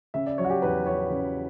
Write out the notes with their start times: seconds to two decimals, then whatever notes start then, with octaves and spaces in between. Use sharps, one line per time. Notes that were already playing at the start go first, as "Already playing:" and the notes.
0.14 C#3 E5
0.26 D5
0.38 F#3 C#5
0.45 F#4
0.50 G4
0.62 E2 B4
0.86 E2 C#5
1.10 C#3